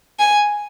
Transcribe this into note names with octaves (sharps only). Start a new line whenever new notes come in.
G#5